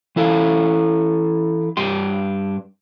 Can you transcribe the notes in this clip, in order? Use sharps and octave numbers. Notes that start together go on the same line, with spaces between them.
E3 E4 A4 F5
G2 G4 C6